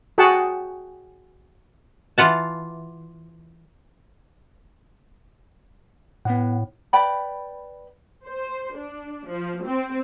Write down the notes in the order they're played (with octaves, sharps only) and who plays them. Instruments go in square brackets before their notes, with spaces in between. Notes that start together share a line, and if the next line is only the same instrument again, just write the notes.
[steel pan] F#4 G#4 F#5 G5 A5
[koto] E3 F4 F#5 A5
[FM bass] A2 [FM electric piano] B3 F#5
[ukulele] B4 D5 G5 B5
[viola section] C5
D4
F3
C4